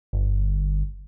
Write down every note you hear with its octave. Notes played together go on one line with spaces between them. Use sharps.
G1